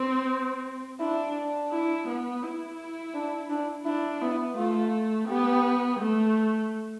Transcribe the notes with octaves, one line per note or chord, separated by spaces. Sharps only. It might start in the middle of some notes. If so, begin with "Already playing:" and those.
Already playing: C4
D4 E4
D4
E4
B3
E4
D4
D4
D4 E4
B3 E4
A3 F4
B3 G4
A3